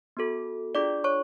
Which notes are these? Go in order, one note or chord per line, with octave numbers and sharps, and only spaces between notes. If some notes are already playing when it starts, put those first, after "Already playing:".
B3 F#4 A4
D4 F4 G#4 D5 D6
C#5 C#6